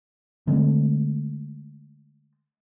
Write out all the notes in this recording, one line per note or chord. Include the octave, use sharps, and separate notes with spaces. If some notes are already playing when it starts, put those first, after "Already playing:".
D3 G#3 A3 C4